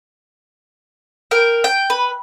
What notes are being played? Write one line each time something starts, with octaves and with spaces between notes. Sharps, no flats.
A#4 G5
G5
B4